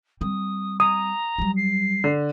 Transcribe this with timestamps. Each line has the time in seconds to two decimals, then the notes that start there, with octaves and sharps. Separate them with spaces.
0.21 G3 C4 D#6
0.80 A#5 D#6
1.38 F#3 G3
1.57 C7
2.04 D3